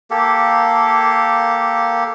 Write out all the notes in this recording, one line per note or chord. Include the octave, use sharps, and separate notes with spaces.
A#3 G4 A4